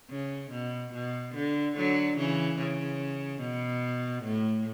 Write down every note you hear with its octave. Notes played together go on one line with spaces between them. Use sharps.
C#3
B2
B2
D3
D3 F#3
C#3 E3
C#3
B2
A2